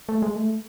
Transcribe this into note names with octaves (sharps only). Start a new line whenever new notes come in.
A3
G#3
A3